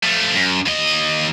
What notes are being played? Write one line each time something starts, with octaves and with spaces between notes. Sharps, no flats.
F3 A3
F#2
D#2 D#5